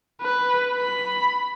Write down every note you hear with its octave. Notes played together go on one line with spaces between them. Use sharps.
B4
B5